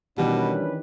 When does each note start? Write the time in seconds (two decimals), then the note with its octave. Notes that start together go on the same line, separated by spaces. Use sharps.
0.18 B2 D#3 E3 G3 C#4 D4 G4 B4